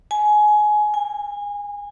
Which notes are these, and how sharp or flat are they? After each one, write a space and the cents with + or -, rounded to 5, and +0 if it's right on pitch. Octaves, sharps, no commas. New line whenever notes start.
G#5 +20
G#5 -25